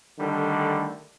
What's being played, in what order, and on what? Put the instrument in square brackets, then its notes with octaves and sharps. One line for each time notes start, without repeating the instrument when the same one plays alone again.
[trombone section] D3 D#3 G3 A3